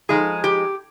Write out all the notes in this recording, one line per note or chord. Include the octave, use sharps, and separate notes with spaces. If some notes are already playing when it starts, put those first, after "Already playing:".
F3 G#3 D#4 G#4
G4